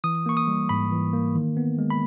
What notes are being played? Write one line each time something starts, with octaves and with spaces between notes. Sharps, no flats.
E3 D#6
A#3 C#6
D#6
G3
G#2 B5
E3
A#3
D#3
B3
G#3
B5